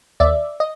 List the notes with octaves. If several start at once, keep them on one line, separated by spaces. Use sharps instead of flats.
D#2 D5 E5
D#5